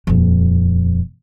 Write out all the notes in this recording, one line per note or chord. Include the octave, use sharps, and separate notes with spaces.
D#1 F2